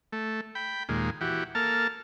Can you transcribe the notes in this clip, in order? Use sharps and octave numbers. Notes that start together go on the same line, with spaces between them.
A3
G5 B5
D#2 A#2 G#3
E3 F#4 G4
A#3 A4 A5 F6